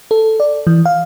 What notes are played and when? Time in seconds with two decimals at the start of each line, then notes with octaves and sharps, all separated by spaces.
0.11 A4
0.40 D5
0.67 E3
0.86 F5